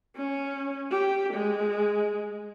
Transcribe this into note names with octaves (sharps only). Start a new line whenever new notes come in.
C#4
G4
G#3